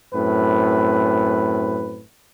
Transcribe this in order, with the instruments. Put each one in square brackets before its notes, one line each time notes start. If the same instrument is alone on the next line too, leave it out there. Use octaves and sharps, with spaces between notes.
[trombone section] F#2 A2 C4 B4